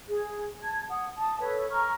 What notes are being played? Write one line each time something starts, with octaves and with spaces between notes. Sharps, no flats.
G#4
A5 G#6
F#5 D#6
A5 D#6
A4 B4 C#5
A#5 C#6 F6